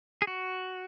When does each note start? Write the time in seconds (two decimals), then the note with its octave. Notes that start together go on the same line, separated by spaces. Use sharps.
0.22 G#4
0.27 F#4